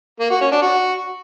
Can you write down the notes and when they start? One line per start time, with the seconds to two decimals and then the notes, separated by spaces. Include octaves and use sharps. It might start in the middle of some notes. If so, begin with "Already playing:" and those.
0.20 A#3
0.31 F#4
0.41 C#4
0.52 D4
0.62 F#4